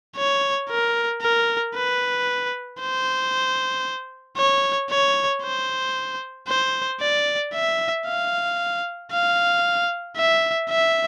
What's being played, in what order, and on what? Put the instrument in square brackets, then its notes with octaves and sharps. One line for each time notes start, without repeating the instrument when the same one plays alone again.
[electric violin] C#5
A#4
A#4
B4
C5
C#5
C#5
C5
C5
D5
E5
F5
F5
E5
E5